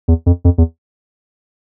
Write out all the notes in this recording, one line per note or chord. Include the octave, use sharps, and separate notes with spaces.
E2
F2
F2
E2